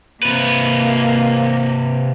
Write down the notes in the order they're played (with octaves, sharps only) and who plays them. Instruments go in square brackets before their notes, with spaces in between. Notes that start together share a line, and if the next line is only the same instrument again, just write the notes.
[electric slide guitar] C3 B4 [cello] A#3